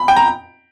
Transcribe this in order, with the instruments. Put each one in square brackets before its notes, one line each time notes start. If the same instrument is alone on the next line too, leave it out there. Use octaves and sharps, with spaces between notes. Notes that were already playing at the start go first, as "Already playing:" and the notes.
Already playing: [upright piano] B5
G5
A#5